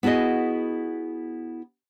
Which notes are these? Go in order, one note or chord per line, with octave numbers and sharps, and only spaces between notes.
B3 E4 F#4 G#4 D#5